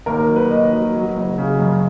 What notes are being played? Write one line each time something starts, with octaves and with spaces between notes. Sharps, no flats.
D#2 A#4
F#3
B4
D#2 D#5
F#3
F#3
F#1
C#3
F#2